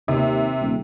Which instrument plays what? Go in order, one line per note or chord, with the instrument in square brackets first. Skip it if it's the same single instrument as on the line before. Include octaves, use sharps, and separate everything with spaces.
[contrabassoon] D#2 [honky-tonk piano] C3
[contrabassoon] D#1